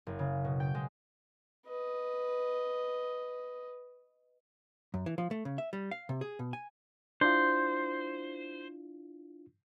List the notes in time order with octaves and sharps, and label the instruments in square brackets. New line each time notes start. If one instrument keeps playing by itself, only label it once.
[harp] F#1
C#3
B2
G5
G#3
[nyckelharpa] B4 D#5
[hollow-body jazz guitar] F#2
E3
F3
A3
C#3
E5
G3
F5
C3
G#4
B2
G#5
[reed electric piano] D4 E4 F4 [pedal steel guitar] C5